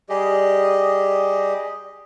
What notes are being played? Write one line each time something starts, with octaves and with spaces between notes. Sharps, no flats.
G3 G4 G#4 D#5